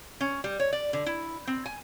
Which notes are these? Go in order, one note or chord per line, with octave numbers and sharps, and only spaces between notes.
C#4
G3
C#5
D5
D3
E4
C4
G#5